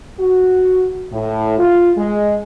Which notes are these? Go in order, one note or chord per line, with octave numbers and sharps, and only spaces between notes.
F#4
A2
F4
G#3